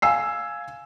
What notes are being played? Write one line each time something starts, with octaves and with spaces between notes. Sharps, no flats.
F5 G#5 E6 C7